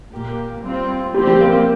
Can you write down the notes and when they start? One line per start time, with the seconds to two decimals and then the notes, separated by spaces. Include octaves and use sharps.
0.11 A#2 A#3 G4
0.63 G3 C4 F4
1.14 F3 G3 C4 G4
1.27 G3
1.40 A#3
1.53 A#3